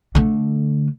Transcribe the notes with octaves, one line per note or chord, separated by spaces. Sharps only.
D3 A3